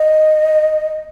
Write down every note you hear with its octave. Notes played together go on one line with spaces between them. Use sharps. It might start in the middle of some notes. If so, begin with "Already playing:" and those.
Already playing: D#5